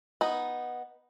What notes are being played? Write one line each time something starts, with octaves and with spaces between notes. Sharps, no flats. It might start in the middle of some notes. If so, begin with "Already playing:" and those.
B3 D#4